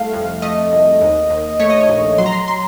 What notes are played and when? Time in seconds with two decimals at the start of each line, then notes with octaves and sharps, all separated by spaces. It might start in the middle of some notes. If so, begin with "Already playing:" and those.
Already playing: C2 A3 F5
0.13 F2
0.42 A3 D#5
0.72 C2
1.01 D#2
1.30 D#2
1.59 A3 C#5
1.70 D#5
1.81 C#5
1.89 A#1
2.18 F#3 C6
2.26 A#5
2.32 C6
2.48 C6